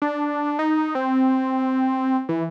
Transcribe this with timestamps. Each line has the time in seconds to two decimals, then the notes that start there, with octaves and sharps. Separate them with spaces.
0.02 D4
0.59 D#4
0.95 C4
2.29 E3